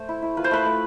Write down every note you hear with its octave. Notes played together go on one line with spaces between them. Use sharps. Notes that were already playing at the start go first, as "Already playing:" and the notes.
Already playing: A3 C5
E4
E4
F4 B4
C5
A3 B4
A3